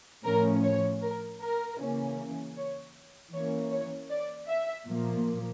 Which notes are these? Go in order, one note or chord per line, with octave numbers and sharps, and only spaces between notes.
A2 F3 C#4 A#4
C#5
A#4
A#4
C#3 E3 A#3 C#4
C#5
E3 A#3 C#4 C#5
C#5
D5
E5
A#2 F3 A#3